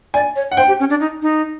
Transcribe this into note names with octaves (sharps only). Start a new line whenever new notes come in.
D5 G#5
C#5
F#5
C5 G5
G4
C#4
D4
D#4
D#4